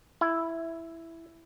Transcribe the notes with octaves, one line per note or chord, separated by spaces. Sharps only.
E4